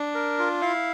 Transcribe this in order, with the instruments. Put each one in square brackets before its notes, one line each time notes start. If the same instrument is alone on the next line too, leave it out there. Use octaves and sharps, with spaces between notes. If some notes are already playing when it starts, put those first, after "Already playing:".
Already playing: [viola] D4
[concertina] A#4
F4
[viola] E4 [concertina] F5